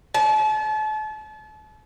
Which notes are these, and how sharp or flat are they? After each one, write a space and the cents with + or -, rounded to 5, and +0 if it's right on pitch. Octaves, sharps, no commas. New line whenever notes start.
A5 -35